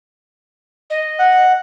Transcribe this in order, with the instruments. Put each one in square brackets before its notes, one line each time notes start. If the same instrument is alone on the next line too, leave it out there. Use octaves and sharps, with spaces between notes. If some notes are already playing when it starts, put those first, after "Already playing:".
[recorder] D#5
[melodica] F#5